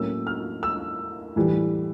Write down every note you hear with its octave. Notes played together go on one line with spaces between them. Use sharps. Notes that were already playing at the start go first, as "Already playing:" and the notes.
Already playing: A2 F#3 A#3 C#4 E6
F6
E6
A2 E3 G3